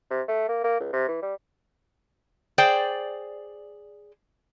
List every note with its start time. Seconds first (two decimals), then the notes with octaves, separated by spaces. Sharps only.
0.10 C3
0.28 A3
0.48 A#3
0.64 A#3
0.80 C#2
0.93 C3
1.08 E3
1.22 G3
2.58 G#4 C5 D5 G5